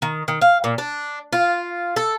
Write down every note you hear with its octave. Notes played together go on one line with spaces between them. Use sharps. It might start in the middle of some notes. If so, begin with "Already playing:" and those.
D#3
D#3
F5
A#2
D4
F4
A4